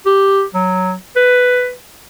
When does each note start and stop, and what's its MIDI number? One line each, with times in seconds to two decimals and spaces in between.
0.06 0.43 67
0.54 0.93 54
1.16 1.72 71